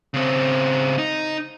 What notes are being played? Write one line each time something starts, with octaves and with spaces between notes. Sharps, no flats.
C#3 C4
D#4